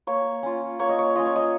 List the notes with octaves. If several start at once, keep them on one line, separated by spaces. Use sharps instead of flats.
A#3 C#5
C#4 F4
A#3 C#5
D#5
C#5
C#4 F4 D#5
C#5
D#5